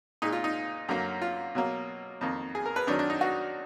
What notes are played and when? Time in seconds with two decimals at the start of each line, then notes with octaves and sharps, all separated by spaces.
0.22 A#2 G#3 D#4
0.32 F4
0.44 D#4
0.89 F#2 D3 F#3 A#3
1.22 F4
1.55 B2 F#3 A#3
2.21 F2 D#3 A#3
2.55 G#4
2.66 A#4
2.76 B4
2.87 F#2 D#3 F#3 D4
2.99 D4
3.10 D#4
3.21 F#4